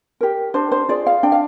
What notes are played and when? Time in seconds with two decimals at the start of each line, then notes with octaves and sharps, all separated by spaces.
0.21 G4 A#4
0.54 D4 C5
0.72 C5
0.89 F4 G#4 D5
1.06 F5
1.23 D4 G5
1.32 F5